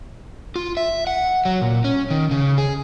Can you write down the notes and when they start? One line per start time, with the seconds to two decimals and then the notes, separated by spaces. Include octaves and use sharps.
0.56 F4
0.77 E5
1.07 F#5
1.45 F#3
1.61 A#2
1.84 C#4
2.10 D#3
2.31 C#3
2.58 G#4